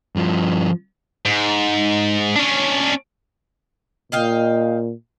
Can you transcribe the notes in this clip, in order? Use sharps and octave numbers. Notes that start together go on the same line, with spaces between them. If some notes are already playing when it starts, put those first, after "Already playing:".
G2 F3
G#2
C#4 D4
A#2 D#5 F5 G5